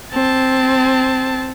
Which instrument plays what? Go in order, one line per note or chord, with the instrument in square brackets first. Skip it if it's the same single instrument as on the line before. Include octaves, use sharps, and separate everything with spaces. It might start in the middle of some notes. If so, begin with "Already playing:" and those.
[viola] C4 A5